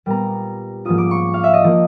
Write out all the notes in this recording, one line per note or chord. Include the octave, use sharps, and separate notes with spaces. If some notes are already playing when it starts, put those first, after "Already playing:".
A#2 G3 B3 A#5
G#2 F3 A#3 C#4 F4 D#6
D6
C#6
F5
E5
D#5
F3 A#3